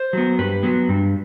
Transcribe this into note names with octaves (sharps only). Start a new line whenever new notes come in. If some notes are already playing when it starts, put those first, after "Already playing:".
Already playing: C5
F#3 B3
G2 B4
F#3 B3
G2